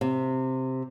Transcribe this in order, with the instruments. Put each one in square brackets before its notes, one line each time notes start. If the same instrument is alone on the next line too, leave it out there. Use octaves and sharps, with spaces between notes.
[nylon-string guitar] C3